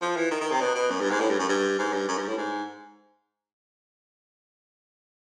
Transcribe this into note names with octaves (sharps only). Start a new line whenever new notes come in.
F3
E3
D#3
D#3
C3
B2
B2
F#2
G2
G#2
A2
G2
F#2
G2
G#2
G2
F#2
G2
A2
G#2